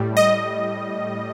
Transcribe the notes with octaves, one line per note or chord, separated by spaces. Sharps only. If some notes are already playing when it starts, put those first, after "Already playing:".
Already playing: A2 G3
D#5